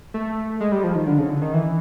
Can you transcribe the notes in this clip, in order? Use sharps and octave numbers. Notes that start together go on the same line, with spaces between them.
A3
G#3
G3
F3
D#3
D3
C#3
D3
D#3
E3